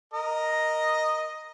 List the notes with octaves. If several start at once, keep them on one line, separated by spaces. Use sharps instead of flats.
A#4 D#5